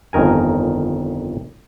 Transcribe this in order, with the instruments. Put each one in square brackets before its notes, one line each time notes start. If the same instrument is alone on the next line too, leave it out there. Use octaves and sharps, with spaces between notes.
[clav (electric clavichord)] G1 F2 D#3 A#4 G#5